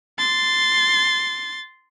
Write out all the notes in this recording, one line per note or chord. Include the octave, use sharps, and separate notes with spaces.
C6 A6